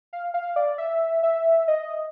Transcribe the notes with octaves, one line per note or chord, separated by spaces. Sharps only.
F5
F5
D5
E5
E5
D#5